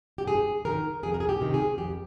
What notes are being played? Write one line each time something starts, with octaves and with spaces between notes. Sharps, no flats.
G4
G2 G#4
D#3 A#4
F2 G#4
A#4
G#4
G4
C3 D#3
G#4
F2 G4